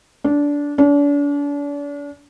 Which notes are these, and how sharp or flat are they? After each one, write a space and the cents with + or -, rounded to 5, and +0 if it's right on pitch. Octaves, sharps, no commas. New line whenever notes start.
D4 -20
D4 -40